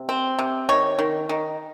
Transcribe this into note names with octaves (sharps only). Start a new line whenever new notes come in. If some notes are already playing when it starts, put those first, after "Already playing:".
Already playing: C3
C4
C3
D#3 C#5
D#3
D#3